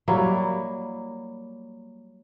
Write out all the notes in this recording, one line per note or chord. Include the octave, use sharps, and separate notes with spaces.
F#3 G3 A#3 E4